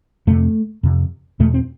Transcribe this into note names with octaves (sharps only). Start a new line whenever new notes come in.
F2 C3 A3
F2 C3
E2 B2 A3
C4